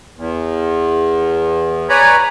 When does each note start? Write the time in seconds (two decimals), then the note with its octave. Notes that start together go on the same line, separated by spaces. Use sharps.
0.16 E2
1.89 B4 C#5 D5 G#5 A#5 B5